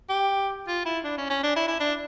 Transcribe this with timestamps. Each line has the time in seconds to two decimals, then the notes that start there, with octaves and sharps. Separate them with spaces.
0.10 G4
0.67 F4
0.85 E4
1.04 D4
1.18 C#4
1.30 C#4
1.43 D4
1.56 E4
1.68 E4
1.80 D4